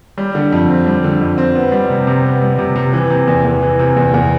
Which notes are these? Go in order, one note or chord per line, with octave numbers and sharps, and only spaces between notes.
G3
D3
F2
C4
G3
D3
F2
C4
B3
G3
C3
C3
B3
G3
C3
C3
E3
C3
E2
E2
E3
C3
E2
E2